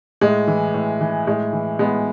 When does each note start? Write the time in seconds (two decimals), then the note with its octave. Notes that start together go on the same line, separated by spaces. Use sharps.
0.21 A2 G#3
0.47 E3
0.74 A2
1.01 E3
1.27 A2 G#3
1.53 E3
1.79 A2 G#3 B3